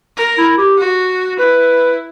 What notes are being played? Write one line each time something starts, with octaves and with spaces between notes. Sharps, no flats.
A#4
E4
G4
F#4
E4 B4